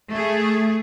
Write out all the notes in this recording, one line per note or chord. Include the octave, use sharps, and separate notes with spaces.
A3 G#4